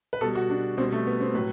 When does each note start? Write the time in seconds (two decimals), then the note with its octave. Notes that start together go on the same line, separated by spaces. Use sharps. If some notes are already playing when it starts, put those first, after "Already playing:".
0.13 B4
0.21 B2 A4
0.24 G3
0.35 F#4
0.50 D4
0.77 B2 C4
0.81 G3
0.92 A3
1.07 B3
1.21 C4
1.34 A2 F#3 B4